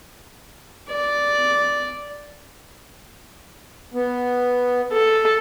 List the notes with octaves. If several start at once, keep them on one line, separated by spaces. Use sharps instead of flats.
D5
B3
A4